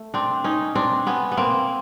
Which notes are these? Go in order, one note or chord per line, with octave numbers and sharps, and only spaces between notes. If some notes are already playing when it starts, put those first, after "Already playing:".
Already playing: A3
C4 D4
C#4 D#4
C4 D4
B3 C#4
B3
A#3 C4